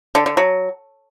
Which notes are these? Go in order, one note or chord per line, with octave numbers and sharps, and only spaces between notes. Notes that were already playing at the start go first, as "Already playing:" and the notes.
D3
D3
F#3